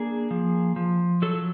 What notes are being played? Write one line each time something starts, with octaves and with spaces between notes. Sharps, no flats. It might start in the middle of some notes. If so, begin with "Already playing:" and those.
Already playing: A#3 D4 G#4
F3
F3
F#3 A4